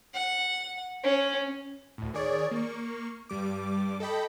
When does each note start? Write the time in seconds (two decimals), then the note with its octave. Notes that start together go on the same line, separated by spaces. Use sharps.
0.13 F#5
1.03 C#4
1.98 D2 A2
2.14 D#3 G#4 C#5 D5
2.51 A#3 C#6
3.30 G2 G3 D6
4.00 A4 D#5 G5 B5